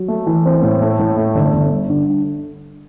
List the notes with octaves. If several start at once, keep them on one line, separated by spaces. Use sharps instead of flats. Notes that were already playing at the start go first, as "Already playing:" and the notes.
Already playing: F#3
A3
E3
C4
A2
A3
A2
A3
G1
G1
G2
D3